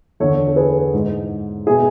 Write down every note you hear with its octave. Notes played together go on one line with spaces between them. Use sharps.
E2 D3 A4 C#5
A4
G#4 B4
G#2 E3
B2 E4 G#4